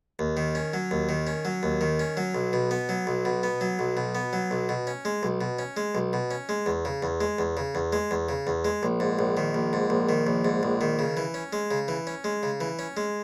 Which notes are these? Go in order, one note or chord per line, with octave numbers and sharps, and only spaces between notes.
D#2
D#3
C#4
F#3
D#2
D#3
C#4
F#3
D#2
D#3
C#4
F#3
B1
B2
B3
F#3
B1
B2
B3
F#3
B1
B2
B3
F#3
B1
B2
C#4
G#3
B1
B2
C#4
G#3
B1
B2
C#4
G#3
E2
C#3
E2
G#3
E2
C#3
E2
G#3
E2
C#3
E2
G#3
A#1
G#2
A#1
D#3
A#1
G#2
A#1
D#3
A#1
G#2
A#1
D#3
C#3
E3
C#4
G#3
C#3
E3
C#4
G#3
C#3
E3
C#4
G#3